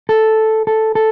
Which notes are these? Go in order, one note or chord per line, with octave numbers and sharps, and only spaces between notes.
A4
A4
A4